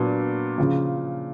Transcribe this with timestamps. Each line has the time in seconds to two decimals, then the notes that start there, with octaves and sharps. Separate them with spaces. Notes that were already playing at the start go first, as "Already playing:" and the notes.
Already playing: A#2 F#3 B3 D4
0.58 C#3 F3